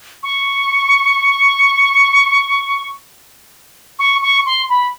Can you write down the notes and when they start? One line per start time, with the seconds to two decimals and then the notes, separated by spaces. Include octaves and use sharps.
0.23 C#6
3.99 C#6
4.22 C#6
4.46 C6
4.70 B5